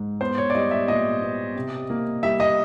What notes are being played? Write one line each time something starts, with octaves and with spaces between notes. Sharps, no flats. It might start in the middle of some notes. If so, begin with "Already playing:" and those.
Already playing: G#2
B3 C5
C#5
D5
G3 D#5
E5
A#2 D#5
B3
C3
A#3
G3 E5
D#5